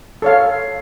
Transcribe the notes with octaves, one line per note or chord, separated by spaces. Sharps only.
A4 C#5 F5